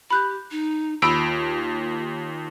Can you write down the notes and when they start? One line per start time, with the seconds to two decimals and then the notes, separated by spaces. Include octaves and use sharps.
0.10 G4 B5 F#6 G6
0.51 D#4
1.02 D#2 F4 B5 E6 D7